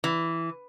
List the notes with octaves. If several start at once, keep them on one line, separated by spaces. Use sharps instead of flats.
E3